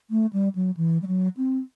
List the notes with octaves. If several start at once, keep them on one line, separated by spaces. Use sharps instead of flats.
A3
G3
F#3
E3
G3
F#3
C4